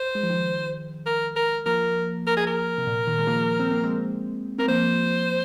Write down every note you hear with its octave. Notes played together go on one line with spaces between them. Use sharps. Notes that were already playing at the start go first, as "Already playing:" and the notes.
Already playing: C5
G#3
F3
D#3 G#3
A#4
A#4
F3 A#3 A#4
A#4
G#4
A#4
C3
A#2
A#2 D#3
G#3
F3 A#3
C4
A#3
G#3 C4
C4 A#4
F3 A#3 C5